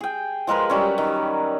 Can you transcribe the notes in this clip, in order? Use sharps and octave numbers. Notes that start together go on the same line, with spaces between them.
G#4 G5
F3 G#3 A#4 B4
F#3 G3 C#4
D#3